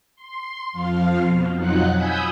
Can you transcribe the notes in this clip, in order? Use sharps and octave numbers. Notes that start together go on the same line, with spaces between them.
C6
F2 F3 F5
B2
F2 F#3 D#4 F4 F#5 F#6
G#5 B5 D#6 E6 G6